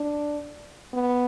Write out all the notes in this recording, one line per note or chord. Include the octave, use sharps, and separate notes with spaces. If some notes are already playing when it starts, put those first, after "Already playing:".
Already playing: D4
B3